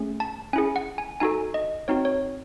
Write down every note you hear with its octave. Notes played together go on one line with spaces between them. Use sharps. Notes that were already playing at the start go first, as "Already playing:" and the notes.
Already playing: A3 C#4 G#4
A5
C#4 E4 G#4 G#5
F#5
G#5
D#4 F#4 A4 G#5
D#5
C4 D#4 F#4 C#5
C#5